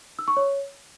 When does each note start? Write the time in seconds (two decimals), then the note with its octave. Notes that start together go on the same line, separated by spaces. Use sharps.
0.19 E6
0.28 C#6
0.37 C#5